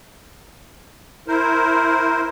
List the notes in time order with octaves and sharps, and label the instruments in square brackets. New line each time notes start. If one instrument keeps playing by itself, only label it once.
[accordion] E4 A#4 C5